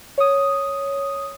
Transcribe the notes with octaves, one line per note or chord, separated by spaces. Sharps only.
C#5 D#6